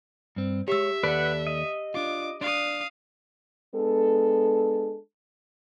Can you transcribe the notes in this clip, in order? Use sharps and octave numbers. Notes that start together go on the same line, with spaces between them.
G2 C4
G#3 G4 C#5 E5 E6
D#2 A4 B4 D5 F#5
D#5
D4 F4 D6
D4 D5 F5 D#6
G#3 B3 D4 A4